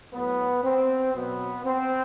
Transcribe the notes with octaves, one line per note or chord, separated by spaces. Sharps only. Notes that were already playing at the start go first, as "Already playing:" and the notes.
A2 F#3 B3
C4
B2 F#3 B3
C4